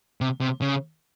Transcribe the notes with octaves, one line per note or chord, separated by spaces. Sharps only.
C3
C3
C#3